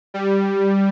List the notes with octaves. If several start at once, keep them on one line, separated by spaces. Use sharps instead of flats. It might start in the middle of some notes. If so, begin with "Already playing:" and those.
G3